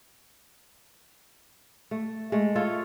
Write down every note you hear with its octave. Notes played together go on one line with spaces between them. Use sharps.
A3
G#3 A3
F4 A4 C#5